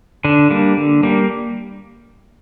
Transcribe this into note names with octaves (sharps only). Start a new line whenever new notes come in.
D3 D4
G3 A#3
D3
G3 A#3